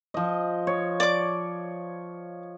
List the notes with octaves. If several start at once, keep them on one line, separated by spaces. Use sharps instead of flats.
F3 D#5
C#5
D5 D6